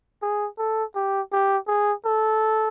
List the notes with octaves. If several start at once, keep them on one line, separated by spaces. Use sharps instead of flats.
G#4
A4
G4
G4
G#4
A4